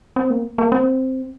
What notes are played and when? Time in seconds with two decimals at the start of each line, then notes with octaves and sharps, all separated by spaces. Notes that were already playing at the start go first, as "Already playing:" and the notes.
0.16 C4
0.30 A#3
0.58 A#3
0.72 C4